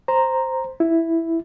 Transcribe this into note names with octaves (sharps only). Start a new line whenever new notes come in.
C5 A#5
E4